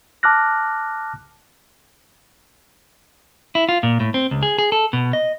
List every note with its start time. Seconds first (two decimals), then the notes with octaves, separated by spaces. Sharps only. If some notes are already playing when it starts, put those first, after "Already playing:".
0.23 A5 D6 F6 F#6 A#6
3.55 E4
3.69 F4
3.83 A#2
4.00 A2
4.14 C4
4.31 C#2
4.43 G#4
4.59 G#4
4.72 A4
4.93 B2
5.13 D#5